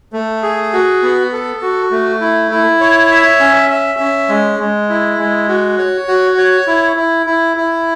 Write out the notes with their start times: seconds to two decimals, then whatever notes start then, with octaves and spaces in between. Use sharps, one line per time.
0.13 A3
0.43 G#4
0.73 F#4
1.02 B3
1.32 A4
1.62 F#4
1.91 A3
2.21 E4
2.51 E4
2.80 C#5
3.11 E5
3.40 C#4
3.70 E5
3.99 C#4
4.29 G#3
4.59 G#3
4.89 E4
5.19 G#3
5.48 F#4
5.78 C#5
6.08 F#4
6.37 C#5
6.67 E4
6.96 E4
7.26 E4
7.57 E4